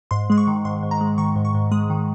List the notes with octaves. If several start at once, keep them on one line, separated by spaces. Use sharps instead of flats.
G#2 C6
G#3 C6
C#6
D#3
G#2 C6
G#2
A#5
G#3
D#3 C#6
G#2
C#6
G#2
G#3 D#6
D#3